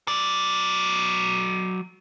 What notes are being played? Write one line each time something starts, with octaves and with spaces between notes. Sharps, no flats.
F#3 D5